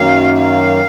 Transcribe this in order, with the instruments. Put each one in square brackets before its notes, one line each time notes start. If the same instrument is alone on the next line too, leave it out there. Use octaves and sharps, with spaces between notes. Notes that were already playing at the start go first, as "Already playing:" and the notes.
Already playing: [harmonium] F#2 D#3 F#3 A#3 [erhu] F5
[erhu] F5